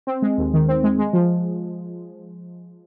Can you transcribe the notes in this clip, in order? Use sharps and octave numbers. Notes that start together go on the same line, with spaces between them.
C4
G#3
D#2
D#3
C4
G#3
G#3
F3